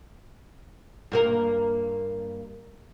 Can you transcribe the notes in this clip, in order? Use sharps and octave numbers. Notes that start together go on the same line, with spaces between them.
G2 A#3 A#4